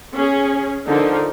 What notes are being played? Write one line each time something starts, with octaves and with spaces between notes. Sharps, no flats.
C#4 G#4
D3 F3 D#4 A#4